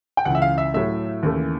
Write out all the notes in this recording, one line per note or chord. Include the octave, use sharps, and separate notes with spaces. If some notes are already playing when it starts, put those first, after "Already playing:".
G5
C#2 C#3 E3 F#5
E5
F5
E5
A2 F#3 A3 E5
D#2 C#3 E3 A3